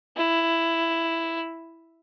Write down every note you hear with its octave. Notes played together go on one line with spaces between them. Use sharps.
E4